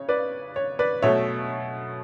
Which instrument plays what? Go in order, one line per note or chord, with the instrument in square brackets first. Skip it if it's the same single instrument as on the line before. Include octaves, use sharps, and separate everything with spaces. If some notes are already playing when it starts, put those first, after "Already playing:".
Already playing: [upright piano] C#3 C#5
B4 D5
C#5
B4 D5
B2 F#3 A3 C#5 E5